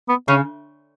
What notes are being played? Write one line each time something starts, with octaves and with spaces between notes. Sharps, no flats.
B3
C#3 C#4